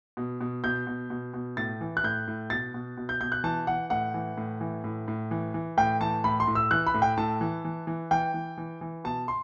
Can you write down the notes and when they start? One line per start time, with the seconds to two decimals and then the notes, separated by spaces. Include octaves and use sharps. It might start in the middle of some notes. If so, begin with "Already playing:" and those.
0.17 B2
0.41 B2
0.64 B2 G6
0.87 B2
1.10 B2
1.34 B2
1.57 A2 A6
1.81 E3
1.97 F#6
2.03 A2 G6
2.28 A2
2.50 B2 A6
2.74 B2
2.97 B2
3.09 G6
3.21 B2 G6
3.32 F#6
3.44 E3 A5
3.67 E3 F#5
3.90 A2 F#5
4.14 E3
4.37 A2
4.61 E3
4.84 A2
5.08 A2
5.31 E3
5.54 E3
5.77 A2 G5
6.00 E3 A5
6.24 A2 B5
6.40 C6
6.47 A2
6.55 E6
6.71 E3 F#6
6.87 B5
6.94 A2
7.02 G5
7.17 A2 A5
7.41 E3
7.65 E3
7.87 E3
8.11 E3 G5
8.34 E3
8.58 E3
8.81 E3
9.04 B2 A5
9.28 C6